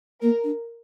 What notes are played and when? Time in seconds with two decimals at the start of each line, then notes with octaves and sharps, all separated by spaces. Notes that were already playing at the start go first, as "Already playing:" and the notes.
0.22 A#3 A#4
0.43 D4